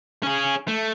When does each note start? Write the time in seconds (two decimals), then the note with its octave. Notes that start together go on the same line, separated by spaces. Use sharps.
0.23 C#4 G#4
0.68 A3